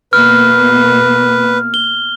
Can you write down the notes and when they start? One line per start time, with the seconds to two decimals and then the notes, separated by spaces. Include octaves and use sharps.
0.13 B2 A#3 B4 F6
1.74 G7